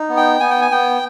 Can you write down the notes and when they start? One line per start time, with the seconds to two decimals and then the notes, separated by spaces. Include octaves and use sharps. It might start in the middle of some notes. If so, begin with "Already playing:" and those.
Already playing: D#4
0.09 B3
0.17 G5
0.40 B3 G#5
0.50 G5
0.61 G#5
0.71 B3 G5